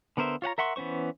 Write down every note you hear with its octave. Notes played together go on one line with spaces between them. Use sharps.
D3 B3 A#4 C5 E5
F4 C#5 F#5 A#5
A#4 E5 F#5 C6 C#6
E3 B3 C#4 C5 C#6